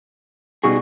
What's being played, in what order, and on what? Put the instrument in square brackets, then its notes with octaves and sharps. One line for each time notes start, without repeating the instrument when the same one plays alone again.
[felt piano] B2 G3 C#6 [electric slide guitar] D#4 F#4 G#4